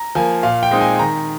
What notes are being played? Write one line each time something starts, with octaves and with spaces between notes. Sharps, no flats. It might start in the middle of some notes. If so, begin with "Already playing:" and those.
Already playing: A#5
F3 A#3 G#5
A#2 F5
G5
G#3 C4 D#4
G#5
D#3 A#5